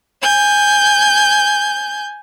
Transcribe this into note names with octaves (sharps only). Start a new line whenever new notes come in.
G#5 G6